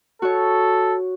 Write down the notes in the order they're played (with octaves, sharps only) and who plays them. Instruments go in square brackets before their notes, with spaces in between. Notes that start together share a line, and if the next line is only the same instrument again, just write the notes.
[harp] F#4 C#5 [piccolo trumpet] A4